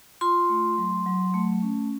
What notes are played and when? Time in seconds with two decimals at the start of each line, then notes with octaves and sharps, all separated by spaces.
0.21 F4 C6
0.49 A3
0.78 F#3
1.06 F#3
1.34 A3
1.62 C#4